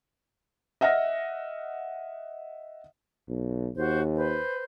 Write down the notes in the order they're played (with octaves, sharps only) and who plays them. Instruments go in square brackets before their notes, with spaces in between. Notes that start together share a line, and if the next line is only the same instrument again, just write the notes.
[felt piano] D#5 E5 F#5 F6 A#6
[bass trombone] B1
[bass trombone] D#2 [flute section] F#4 C5
[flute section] B4 C5